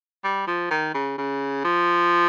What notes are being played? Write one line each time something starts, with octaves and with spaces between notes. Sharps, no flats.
G3
F3
D#3
C#3
C#3
F3